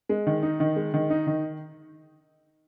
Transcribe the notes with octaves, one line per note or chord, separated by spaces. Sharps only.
G#3
D#3
D#4
D#3
G#3
D#3
D#4
D#3